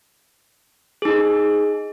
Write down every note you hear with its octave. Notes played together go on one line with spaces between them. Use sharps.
D#4 G#4